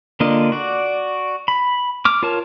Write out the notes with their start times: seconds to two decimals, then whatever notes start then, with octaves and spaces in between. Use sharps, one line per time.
0.20 D3 A#3 D4 F4 D#5
0.52 F#4 D5
1.48 B5
2.05 D6 F6
2.23 F4 A#4 C#5 A5